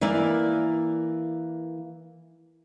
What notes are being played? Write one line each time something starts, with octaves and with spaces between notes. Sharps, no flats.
E3 A#3 A#4 D5 E5